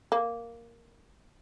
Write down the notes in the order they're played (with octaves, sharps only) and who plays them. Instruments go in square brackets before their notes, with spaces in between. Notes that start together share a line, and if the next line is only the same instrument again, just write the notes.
[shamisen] A#3